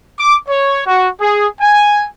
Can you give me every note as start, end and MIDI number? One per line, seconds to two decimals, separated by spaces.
0.19 0.37 86
0.48 0.82 73
0.87 1.09 66
1.21 1.47 68
1.60 2.06 80